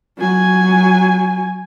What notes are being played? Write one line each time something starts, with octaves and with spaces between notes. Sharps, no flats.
F#3 G#5